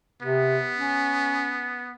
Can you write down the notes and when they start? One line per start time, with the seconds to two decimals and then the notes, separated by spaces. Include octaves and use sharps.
0.22 C3 B3
0.76 C#4